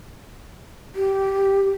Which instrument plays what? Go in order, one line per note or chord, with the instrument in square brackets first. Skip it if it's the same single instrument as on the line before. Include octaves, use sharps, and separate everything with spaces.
[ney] G4